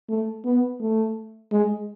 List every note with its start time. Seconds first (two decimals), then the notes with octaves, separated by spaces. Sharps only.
0.09 A3
0.45 B3
0.81 A3
1.52 G#3